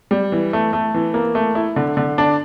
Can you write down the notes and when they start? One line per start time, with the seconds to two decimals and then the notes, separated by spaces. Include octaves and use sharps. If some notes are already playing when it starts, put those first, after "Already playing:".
0.11 G3
0.32 E3
0.53 A3
0.73 A3
0.94 E3
1.14 A#3
1.35 A3
1.55 E4
1.76 D3
1.97 D3
2.18 D4